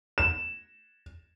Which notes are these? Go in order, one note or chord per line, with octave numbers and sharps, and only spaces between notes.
E7